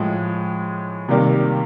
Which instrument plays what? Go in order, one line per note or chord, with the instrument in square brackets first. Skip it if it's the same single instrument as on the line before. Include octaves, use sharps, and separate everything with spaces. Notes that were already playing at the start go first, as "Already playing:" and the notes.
Already playing: [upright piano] A2 F3 G#3
C3 D#3 G3 A#3